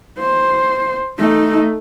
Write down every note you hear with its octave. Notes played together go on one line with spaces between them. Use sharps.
C5
A3 D#4